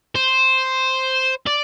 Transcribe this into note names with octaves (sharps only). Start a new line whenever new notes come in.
C5
D5